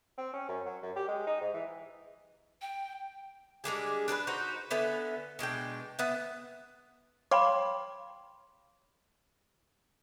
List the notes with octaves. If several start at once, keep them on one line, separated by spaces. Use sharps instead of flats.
C4
C#4
F#2
F#3
F#2
G4
G#3
D#4
G#2
E3
G5
G3 G#3 D4 G#4
D4 G#4 A4 B4
D#4 F#4 B4 C5
D3 B3 E5 G#5
B2 G#3 D4 G5
B3 E5 F#5
C#5 F5 G5 B5 C6 D6